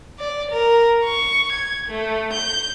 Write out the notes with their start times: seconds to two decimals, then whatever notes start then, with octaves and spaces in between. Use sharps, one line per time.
0.19 D5
0.51 A#4
1.05 C#6
1.52 G#6
1.88 A3
2.33 G6